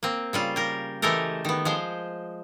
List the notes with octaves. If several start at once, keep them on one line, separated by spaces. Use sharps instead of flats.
A#3 C4
C#3 G3 F4
G4 A#4
E3 G#3 A3 G4 A4 A#4
D#3 B3
F3 G#3 C5